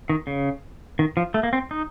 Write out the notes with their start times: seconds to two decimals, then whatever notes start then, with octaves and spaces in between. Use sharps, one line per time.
0.09 D#3
0.27 C#3
0.99 D#3
1.17 F3
1.34 A3
1.43 A#3
1.53 C4
1.71 D#4